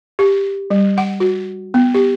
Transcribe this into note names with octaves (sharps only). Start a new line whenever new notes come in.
G4
G3
F#5
F#4
B3
G4